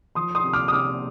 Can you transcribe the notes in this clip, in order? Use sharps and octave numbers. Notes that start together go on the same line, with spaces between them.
F3 C6 D#6
C6 D#6
C3
D6 F6
D#6
C3 D6 F6